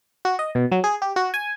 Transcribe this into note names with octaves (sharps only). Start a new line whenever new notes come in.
F#4
D#5
B2
F#3
G#4
G4
F#4
G#5